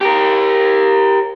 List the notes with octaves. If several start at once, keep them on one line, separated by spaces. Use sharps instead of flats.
G4 A#4